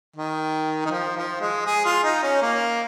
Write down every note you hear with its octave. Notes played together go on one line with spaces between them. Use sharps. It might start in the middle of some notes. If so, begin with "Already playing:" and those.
D#3
D#3
F3
F3
G#3
G#4
F4
D#4
C#4
A#3